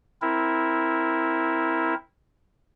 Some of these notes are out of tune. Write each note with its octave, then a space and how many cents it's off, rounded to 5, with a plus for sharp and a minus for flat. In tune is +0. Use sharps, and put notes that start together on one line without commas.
C4 +0 E4 -5 A#4 +0